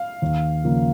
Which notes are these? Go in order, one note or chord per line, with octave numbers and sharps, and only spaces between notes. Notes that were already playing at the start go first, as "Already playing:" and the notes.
Already playing: F5
D#2
C#3 F3 A#3